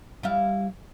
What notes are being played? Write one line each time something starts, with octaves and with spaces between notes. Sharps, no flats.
G3 E4 F5